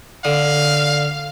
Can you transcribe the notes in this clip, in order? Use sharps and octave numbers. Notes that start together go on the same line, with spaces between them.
D3 F5